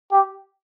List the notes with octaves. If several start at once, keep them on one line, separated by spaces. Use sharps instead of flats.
G4